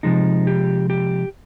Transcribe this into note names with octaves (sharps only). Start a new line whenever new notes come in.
C3 F3 G#3 D#4
G4
G4